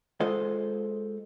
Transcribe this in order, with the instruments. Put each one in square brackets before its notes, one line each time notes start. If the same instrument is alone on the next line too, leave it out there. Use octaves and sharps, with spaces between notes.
[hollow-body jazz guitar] G#3 F4 A4 C5 D#5